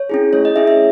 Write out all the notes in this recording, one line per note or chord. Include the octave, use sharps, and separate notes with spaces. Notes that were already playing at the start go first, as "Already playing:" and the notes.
Already playing: C#5
C#4 E4 G#4
A3 C#5
D#5
C#4 E4 G#4 E5
E5